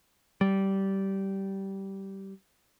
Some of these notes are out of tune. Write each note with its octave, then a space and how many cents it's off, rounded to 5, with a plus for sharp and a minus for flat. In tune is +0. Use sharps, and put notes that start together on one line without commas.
G3 -15